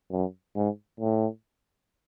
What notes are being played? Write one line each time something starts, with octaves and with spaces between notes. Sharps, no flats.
F#2
G#2
A2